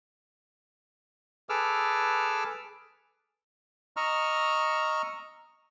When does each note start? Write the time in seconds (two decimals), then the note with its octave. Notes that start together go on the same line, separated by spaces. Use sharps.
1.49 G#4 A4 B4 D6 E6 F6
3.97 D#5 A#5 C#6 E6 F6